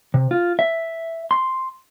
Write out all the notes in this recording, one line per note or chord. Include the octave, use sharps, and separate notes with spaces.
C3
F4
E5
C6